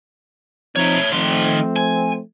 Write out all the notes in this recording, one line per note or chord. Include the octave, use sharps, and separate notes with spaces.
F3 C4 D#4 E4 C#5
D#3 F3 A3 C4 C6
G#5